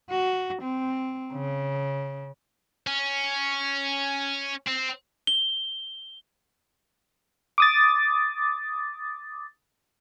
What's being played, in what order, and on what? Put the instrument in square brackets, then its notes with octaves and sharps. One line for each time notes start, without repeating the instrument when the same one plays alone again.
[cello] F#4
C4
C#3
[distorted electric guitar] C#4
C4
[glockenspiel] G7
[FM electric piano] D6 D#6 A6